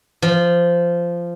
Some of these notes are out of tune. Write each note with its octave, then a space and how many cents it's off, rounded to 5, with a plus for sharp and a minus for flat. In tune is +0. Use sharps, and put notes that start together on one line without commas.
F3 -15